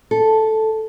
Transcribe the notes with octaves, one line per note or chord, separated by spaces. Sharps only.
A4